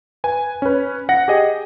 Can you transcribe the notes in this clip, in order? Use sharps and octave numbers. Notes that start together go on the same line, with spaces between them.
B4 G#5
C#4 B4
F#5 A#6
G4 G#4 D#5